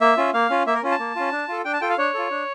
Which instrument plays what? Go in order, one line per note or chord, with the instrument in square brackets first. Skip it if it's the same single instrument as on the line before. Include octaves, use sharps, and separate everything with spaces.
[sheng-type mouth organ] A#3 E5
C#4 F4
A#3 F5
C#4 F4
A#3 E5
A#4
C#4 F4
A5
A#3
C#4 F4
D4
F4 A4
D4 G5
A5
F4 A4 G5
F5
D4 C#5
F4 A4
D4